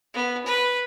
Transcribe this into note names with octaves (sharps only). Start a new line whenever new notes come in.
B3
B4